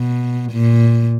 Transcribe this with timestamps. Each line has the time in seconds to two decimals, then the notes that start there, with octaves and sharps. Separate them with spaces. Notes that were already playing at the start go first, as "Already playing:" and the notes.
Already playing: B2
0.52 A#2